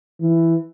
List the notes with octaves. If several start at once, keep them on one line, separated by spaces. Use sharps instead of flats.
E3